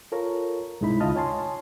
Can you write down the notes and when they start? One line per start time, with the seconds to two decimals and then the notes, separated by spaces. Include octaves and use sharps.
0.12 F4 A4 A#4 C#5 A#5
0.81 C2 G#2 G#3 D#4 E4 B5
1.00 D2 C#3 F4 D#5 A5 F6
1.16 C#5 G#5 A5 C6